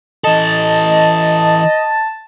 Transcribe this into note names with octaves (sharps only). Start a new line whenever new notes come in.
E3 A4 D#5 A5